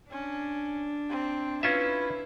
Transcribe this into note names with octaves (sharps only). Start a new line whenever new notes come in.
C#4 D4
C4
C#4 E4 F4 B4 E5